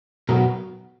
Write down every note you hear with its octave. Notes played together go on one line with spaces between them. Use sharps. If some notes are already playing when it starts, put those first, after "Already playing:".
B2 F#3 B3 A#4